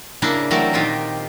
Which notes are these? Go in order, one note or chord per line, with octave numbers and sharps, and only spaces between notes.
C#3 A#3 D4 E4 A#4
E3 F#3 A3 C4 A#4 D5
A#2 D#3 C4 F4 G4